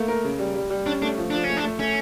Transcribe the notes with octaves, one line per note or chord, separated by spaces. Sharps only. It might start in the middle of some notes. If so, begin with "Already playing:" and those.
Already playing: A3 A#3
A#4
C#3
G3
G3
G3
C#4 D4
A3 D4
F3
F3 D4
C#4
A3
D4
A3
A3 C#4